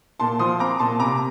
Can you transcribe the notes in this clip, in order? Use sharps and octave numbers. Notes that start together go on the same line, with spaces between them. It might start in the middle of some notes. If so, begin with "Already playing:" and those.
A#2 A5 C6
F3 C6 D#6
C4 A#5 D6
A#2 A5 C6
C3 A#5 D6